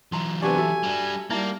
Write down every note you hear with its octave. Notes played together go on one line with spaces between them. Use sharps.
E3 F#3 A#5 C6
C3 B3 D4 G4 G#5
F#4 A4 E5
G3 D4
G3 A#3 D#4 E4 E5